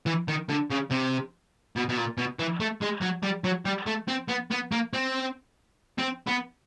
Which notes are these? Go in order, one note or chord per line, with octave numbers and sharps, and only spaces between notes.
E3
D#3
D3
C#3
C3
B2
B2
A#2
B2
E3
A3
G#3
F#3
G3
F#3
G3
A3
C4
B3
B3
A#3
C4
C4
B3